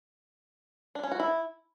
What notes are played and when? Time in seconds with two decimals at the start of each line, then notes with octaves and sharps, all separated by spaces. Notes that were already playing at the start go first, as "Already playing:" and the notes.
0.95 D4
1.03 C#4
1.11 F#4
1.20 E4